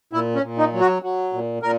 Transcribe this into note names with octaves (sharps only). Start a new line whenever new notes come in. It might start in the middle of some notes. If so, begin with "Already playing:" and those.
A#2 E4
C#4
A#2
D#4
F#3
F#4
F#3
A#2
A#2 A#4